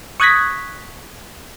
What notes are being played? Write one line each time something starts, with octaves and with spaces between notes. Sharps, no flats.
C#6 D#6 F#6 G#6 A#6 B6